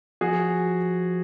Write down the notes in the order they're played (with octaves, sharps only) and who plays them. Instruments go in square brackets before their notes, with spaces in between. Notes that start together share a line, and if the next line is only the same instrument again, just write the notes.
[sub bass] F3 [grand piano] F#4 G#4